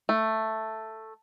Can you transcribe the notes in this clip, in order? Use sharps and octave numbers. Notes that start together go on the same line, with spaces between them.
A3